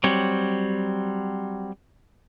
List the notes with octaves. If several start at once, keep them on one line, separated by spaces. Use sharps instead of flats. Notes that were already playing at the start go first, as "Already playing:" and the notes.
F#3 G3 C4 C#5